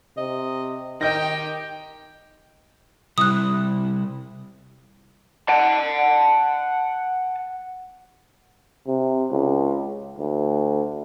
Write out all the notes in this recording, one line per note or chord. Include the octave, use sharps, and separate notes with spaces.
C3 D#5
D#3 D#4 G4 D#5 G5 G6 A#6
C3 G3 E4 D#6 F#6
F#5 A5
C3
C#2
D2